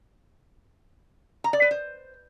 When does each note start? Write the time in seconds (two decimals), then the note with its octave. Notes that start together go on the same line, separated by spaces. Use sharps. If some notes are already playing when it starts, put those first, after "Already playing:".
1.44 A#5
1.53 D5
1.62 B4
1.71 C5